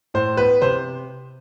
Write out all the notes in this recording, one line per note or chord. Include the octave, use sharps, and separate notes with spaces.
A2 C5
B3 B4
C3 C5